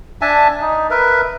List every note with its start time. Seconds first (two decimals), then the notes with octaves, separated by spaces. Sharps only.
0.21 D4 E5 G#5 A5
0.61 D#4
0.90 A#4 B4 E5